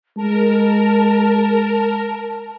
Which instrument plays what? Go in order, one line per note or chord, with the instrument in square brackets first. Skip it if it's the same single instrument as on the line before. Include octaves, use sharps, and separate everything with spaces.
[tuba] G#3 [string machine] A#4 [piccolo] A5